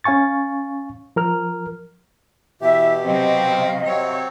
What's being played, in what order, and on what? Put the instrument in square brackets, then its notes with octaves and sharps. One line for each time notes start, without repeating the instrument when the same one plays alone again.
[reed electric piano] C#4 F5 G#5 C#6 A6
F3 A#4 F6
[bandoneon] B2 G4 [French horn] E3 [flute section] E5
[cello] C3 F#3 [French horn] C4 [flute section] D#5 F5
[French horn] C3 [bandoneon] F#3 C4 [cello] C#5